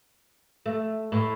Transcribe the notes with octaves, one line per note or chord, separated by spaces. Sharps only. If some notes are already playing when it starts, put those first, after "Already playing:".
A3
A2